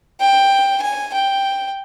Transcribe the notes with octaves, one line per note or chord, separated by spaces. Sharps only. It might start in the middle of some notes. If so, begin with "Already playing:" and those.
G5
G#5
G5